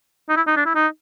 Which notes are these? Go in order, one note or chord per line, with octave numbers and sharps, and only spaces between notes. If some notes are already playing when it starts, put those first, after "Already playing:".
D#4
E4
D#4
D4
E4
D#4